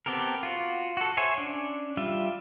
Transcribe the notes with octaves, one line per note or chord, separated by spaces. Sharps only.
B3 C4 G4 A4 A#4
F4 F#4
F#4 A4
C5 C#5 E5 G#5
C#4 D4
G3 F4 E5